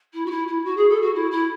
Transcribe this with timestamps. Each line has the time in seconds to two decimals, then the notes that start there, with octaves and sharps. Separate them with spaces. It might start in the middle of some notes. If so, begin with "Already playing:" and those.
0.13 E4
0.26 F#4
0.30 E4
0.47 E4
0.64 F#4
0.76 G#4
0.89 A4
1.02 F#4
1.14 E4
1.31 E4